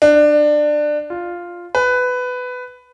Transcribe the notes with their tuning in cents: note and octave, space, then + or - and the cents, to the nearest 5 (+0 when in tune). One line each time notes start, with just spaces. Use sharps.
D4 +20
F4 +0
B4 +15